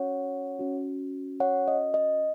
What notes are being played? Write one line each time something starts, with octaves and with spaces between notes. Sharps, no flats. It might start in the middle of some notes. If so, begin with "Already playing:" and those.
Already playing: C#4 F#4 C#5 F#5
C#4 F#4
C#5 F#5
D#5
D#5